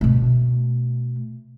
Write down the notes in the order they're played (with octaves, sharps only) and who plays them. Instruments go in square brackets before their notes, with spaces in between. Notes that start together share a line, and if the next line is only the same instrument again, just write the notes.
[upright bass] B2 A3